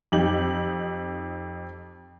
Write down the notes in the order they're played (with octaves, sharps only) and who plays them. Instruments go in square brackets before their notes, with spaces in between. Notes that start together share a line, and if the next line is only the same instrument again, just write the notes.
[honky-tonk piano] F2 D#4 G4 F#7